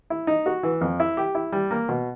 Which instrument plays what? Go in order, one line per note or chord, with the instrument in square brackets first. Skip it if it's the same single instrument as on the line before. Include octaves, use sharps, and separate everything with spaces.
[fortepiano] E4
D#4
F#4
E3
F2
E4
G4
E4
G3
A#3
B2